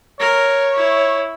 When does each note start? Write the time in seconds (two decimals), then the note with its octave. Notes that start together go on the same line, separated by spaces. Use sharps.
0.20 A#4 C#5
0.74 E4